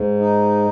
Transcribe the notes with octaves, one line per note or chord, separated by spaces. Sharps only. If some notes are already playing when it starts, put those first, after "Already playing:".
Already playing: G#2
D#4